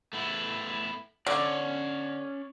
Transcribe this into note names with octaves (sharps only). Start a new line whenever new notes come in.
A3 B3 E4
D3 C#4 C#5 D5